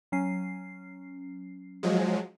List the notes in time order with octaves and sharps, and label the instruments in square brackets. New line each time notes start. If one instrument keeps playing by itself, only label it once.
[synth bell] F#3 C#4 C7
[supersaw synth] F3 F#3 G#3